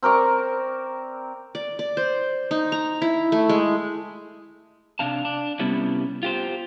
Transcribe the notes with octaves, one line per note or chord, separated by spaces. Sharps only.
C4 A#4 D5 C#6
D5
D5
C5
D#4
A#5
E4
A3
G#3
C3 D4 F5 A5
D4
C3 G3 B3 C#4 E4
F4 G4 C5